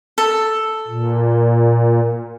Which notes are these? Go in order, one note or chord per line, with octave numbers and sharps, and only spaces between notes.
A4
A#2